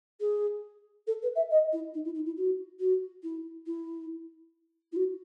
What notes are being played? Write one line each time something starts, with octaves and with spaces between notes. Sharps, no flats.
G#4
A4
B4
E5
D#5
E4
D#4
E4
D#4
E4
F#4
F#4
E4
E4
E4
F#4